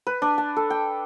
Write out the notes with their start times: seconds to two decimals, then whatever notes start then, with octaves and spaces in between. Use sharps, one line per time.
0.07 B4
0.22 D4
0.38 A5
0.57 A4
0.70 G5